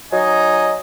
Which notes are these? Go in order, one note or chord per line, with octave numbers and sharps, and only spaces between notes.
F#3 D#4 D#5 G#5